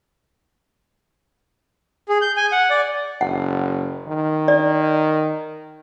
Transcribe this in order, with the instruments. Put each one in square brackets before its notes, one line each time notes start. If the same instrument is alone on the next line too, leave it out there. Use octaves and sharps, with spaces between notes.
[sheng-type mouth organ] G#4
G6
G#5
F#5
D5
[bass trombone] F#1 [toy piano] F#5
[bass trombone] D#3
[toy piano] D5